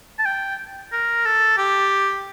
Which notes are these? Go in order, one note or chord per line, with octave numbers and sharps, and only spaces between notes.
A5
G5
A#4
A4
G4